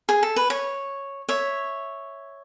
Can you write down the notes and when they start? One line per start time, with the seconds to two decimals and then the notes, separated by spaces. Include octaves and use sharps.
0.09 G#4
0.23 A4
0.36 B4
0.50 C#5
1.29 C#5 E5